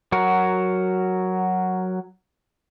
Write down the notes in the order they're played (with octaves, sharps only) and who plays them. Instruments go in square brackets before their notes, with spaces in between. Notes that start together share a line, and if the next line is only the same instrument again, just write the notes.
[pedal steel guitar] F#3 F#4 A#4